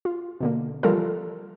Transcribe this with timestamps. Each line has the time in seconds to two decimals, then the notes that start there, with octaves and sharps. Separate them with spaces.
0.05 F4
0.40 B2 D3 A#3
0.83 E3 F3 G3 F4 A4 A#4